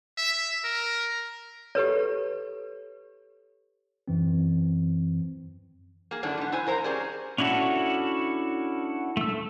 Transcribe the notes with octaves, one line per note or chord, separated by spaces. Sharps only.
E5
A#4
G4 A4 B4 C#5
F#2 E3 C4
A#3 G#4
F#2 D3 A3 D4 E4
G#2 B3
E4 C5 G#5
F2 A#4 C5 A#5
C#4 G4 G#4 C5 D5
C#4 D4 E4 F#4 A4
A3 E6